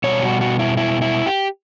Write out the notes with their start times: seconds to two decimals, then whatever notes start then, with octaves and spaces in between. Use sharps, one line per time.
0.04 B2 G3 C#5
0.22 F#4
0.41 F#4
0.59 E4
0.77 E4
1.02 E4
1.26 G4